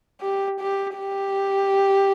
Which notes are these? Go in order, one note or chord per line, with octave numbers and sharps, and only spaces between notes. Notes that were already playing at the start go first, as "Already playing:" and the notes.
G4
G4
G4